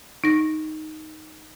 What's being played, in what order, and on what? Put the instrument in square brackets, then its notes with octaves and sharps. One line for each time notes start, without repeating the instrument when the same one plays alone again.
[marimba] D#4 A#6